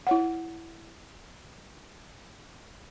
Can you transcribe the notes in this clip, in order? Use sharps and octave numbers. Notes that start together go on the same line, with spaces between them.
E4 C#5 F#5